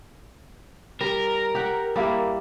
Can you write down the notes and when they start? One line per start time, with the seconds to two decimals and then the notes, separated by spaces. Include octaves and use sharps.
1.01 G3 A#4
1.55 G4 F#5
1.96 G3 A#3 E4